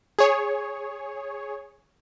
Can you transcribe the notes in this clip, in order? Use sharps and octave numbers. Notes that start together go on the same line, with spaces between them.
G#4 C#5